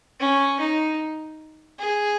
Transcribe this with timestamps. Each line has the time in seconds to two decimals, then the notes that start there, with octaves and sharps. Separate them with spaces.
0.20 C#4
0.60 D#4
1.80 G#4